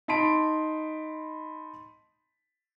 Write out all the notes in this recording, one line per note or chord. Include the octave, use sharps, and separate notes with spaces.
D#4 A5 B5 C6 B6 D7